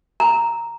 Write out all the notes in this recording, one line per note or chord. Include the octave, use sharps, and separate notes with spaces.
A#5